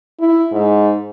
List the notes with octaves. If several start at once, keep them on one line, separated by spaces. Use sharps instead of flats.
E4
G#2